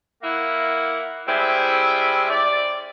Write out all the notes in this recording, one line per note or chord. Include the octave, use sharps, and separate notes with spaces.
A#3 E4 F#5
G3 G#3 C4 E4
D5